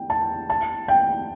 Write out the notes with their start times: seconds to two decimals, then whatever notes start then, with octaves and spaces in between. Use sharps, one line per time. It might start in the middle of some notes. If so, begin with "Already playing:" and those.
Already playing: G5
0.10 A5
0.50 A5
0.88 G5